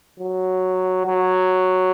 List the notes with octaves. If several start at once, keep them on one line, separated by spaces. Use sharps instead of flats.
F#3
F#3